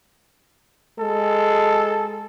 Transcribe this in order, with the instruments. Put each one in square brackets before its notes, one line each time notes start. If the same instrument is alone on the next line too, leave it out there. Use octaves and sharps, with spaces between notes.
[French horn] G#3 [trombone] A4